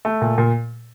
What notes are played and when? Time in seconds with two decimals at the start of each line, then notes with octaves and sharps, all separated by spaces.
0.05 A3
0.21 A#2
0.38 A#2